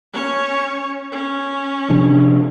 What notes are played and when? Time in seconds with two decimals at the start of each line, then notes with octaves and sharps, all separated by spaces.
0.13 C#4 C#5
1.12 C#4
1.90 C3 F3 D4